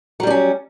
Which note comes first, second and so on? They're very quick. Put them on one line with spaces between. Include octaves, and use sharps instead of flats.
F#3 G3 D4 C#4